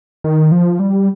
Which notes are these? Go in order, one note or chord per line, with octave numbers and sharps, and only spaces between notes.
D#3
F3
G3